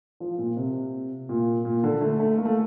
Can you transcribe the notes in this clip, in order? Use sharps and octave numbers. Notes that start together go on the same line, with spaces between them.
F3
A#2
C3
A#2
A#2
D3
A3
A3
A#3
A3